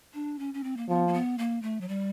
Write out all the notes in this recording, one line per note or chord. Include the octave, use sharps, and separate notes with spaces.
D4
C#4
C#4
C4
A#3
F3 B3
A#3
B3
A#3
A3
F#3
G3